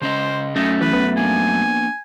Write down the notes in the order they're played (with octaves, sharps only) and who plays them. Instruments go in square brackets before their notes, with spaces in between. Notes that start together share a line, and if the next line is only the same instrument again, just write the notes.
[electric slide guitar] C#3 C#4 D#5 [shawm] C5
[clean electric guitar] F#2 A3 [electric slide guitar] C#4 [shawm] D#4
[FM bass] E3 [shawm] B4
[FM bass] B3
[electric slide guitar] A#3 D4 [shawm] G#5